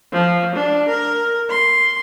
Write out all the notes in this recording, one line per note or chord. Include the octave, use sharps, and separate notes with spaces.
F3
D4
A#4
C6